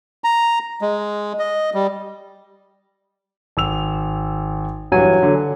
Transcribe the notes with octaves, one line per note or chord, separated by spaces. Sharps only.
A#5
G#3
D#5
G3
G#1 E6 F7
G2 E3 F#3 G#5
D3